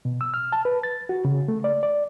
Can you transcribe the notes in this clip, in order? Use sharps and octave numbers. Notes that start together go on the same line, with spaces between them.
B2
E6
F6
A5
B4
A6
F#4
C#3
A3
D5
D5